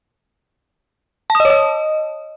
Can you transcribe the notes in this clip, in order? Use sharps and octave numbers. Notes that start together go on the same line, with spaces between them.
A5
D#6
D#5
C#5
D#5